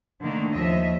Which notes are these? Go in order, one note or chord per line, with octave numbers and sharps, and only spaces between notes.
D3 D#3 A3 A#3
D#2 F3 D#5 E5